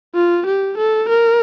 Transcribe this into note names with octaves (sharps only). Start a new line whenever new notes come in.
F4
G4
A4
A#4